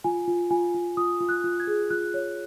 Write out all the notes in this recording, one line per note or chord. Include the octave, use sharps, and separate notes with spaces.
F4 G#5
F4
F4 G#5
F4
F4 D#6
F4
F#6
F4
G#6
G#4
F4 F#6
C#5